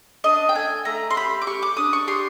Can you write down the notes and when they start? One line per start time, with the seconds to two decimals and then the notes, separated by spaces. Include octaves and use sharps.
0.24 D4 D#5
0.49 G5
0.55 A3 G#5
0.85 A3 A#5
1.11 C6
1.17 G4 B5
1.41 D6
1.47 G4 C#6
1.62 D6
1.77 D4 D#6
1.93 C#6
2.07 G4 C6